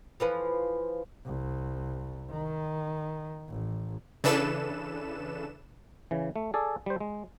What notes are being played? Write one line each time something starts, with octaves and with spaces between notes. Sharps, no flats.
E3 F3 B4
C2
D#3
A1
C#3 E3 D4 A4 B4 E7
C#3 E3
A3
G#4 A4 D5
G3 C5
G#3